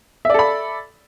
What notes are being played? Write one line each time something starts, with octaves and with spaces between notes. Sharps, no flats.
A4 D5 E5 B5